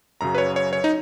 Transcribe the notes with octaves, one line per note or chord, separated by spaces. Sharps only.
F#2 C#3 F#3 A#5
B4
C#5
C#5
C#5
D#4